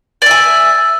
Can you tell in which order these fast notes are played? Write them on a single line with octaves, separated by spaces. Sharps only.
D5 E5 G#5